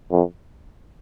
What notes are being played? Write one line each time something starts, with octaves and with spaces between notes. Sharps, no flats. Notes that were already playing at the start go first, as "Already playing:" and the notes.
F2